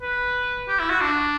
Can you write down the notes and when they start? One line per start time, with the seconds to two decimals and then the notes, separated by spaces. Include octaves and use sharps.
0.01 B4
0.68 G4
0.79 E4
0.90 F#4
1.01 D4